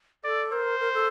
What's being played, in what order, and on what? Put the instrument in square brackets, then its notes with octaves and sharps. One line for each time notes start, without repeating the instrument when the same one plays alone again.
[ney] A4 [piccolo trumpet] D5
[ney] A#4 [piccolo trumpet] C5
[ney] A#4
A4